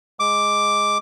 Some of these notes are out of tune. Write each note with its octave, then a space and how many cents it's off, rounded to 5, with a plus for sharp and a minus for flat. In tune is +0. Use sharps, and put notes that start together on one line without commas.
G#3 +0 D6 +0